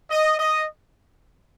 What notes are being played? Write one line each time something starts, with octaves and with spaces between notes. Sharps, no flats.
D#5
D#5